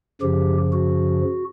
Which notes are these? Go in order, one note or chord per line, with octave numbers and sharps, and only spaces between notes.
F#2 C#3 F3 G4
F#4